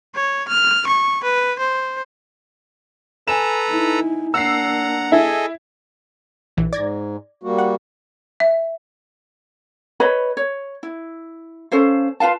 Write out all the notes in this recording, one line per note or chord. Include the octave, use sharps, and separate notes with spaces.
C#5
F6
C#6
B4
C5
A4 B4 G#5 A#5 E7
D#4 E4
A#3 D4 F#5 A#5 E6 C7
E4 G#4 A4 D#5
A#1 E3
G#2 D5 G#6 A#6
G3 A#3 F#4
F#5
E5
B4 C#5 D#5 B5
C#5
E4
C#4 A4 C5 F5
F4 B4 F5 A5